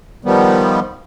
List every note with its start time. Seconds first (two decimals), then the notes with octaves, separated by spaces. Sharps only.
0.25 D#3 F3 G3 B3